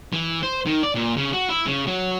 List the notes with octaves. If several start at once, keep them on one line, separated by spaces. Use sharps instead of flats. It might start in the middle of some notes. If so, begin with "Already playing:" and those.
E3
C5
D#3
D5
A#2
C#3
F#4
E4
C#3
F#3